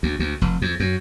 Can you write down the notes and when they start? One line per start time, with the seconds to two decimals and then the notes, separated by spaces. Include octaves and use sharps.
0.03 D2
0.19 D2
0.41 F1
0.62 F2
0.80 F#2